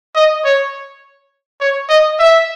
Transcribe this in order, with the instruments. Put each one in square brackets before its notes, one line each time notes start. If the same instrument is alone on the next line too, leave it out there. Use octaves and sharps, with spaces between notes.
[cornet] D#5
C#5
C#5
D#5
E5